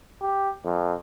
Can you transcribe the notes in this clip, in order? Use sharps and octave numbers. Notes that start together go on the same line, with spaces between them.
G4
F2